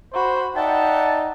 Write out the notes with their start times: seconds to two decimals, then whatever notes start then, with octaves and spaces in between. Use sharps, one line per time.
0.13 F#4 C5 B5
0.56 D#4 D5 E5 F#5 G5 A5